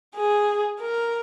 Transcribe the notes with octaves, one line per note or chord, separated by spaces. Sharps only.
G#4
A#4